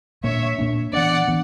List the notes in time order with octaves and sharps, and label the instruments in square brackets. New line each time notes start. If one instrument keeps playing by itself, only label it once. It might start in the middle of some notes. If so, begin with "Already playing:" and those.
[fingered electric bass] A#2 A#3 D4 [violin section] C#5 E5
[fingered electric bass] A#2 A#3 D4
[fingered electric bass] E3 B3 D4 [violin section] D5 F#5
[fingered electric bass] E3 B3 D4